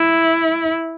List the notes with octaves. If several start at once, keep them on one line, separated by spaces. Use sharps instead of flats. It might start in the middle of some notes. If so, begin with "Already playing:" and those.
Already playing: E4